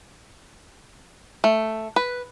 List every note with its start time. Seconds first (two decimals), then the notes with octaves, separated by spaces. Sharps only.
1.44 A3
1.96 B4